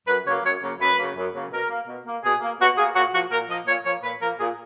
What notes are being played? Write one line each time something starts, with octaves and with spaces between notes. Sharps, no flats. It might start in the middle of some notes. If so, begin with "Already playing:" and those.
F#2 B4
C#3 F#3 A#3 C#5
F#2 C#5
C#3 F#3 A#3
F#2 B4
C#3 F#3 A#3
F#2
C#3 F#3 A#3
B2 A#4
A#3
B2
A#3
B2 G#4
A#3
B2 F#4
A#3 G#4
A#2 F#4
F3 A#3 F#4
A#2 A#4
F3 A#3 D#5
A#2 C#5
F3 A#3 C#5
A#2 B4
F3 A#3 A#4
A#2 G#4